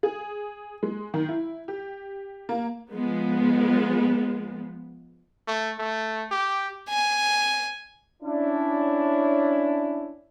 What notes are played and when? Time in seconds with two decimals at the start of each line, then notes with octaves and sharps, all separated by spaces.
0.03 G#4
0.83 G#3
1.14 D#3
1.28 E4
1.68 G4
2.49 A#3
2.93 F3 G#3 B3
5.47 A3
5.78 A3
6.31 G4
6.89 G#5
8.22 C#4 D4 E4